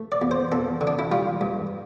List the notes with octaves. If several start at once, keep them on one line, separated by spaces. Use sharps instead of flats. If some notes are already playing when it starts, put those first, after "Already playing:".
Already playing: A3
D5
E2
C5
E2 A4
D3
D4
E4
G3 F4
G2